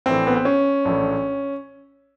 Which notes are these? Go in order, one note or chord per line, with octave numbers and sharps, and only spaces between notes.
A#1 A2 E3 C4
B3
C4
C#4
A#1 A2 E3